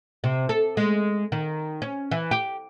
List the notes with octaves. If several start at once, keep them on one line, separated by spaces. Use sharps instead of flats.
C3
A4
G#3
D#3
C#4
E3
G4